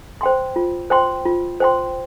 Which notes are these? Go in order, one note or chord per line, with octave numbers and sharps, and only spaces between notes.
C5 G5 C6
F4
C5 G5 C6
F4
C5 G5 C6